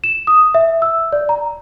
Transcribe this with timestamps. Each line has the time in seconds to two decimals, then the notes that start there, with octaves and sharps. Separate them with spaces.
0.04 E7
0.27 D#6
0.55 E5
0.82 E6
1.13 D5
1.29 A#5